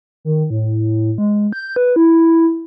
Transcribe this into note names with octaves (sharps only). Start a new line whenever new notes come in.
D#3
A2
G#3
G6
B4
E4